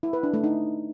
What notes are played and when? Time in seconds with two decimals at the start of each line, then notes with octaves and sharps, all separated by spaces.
0.03 E4
0.13 B4
0.23 D4
0.33 A3
0.44 D#4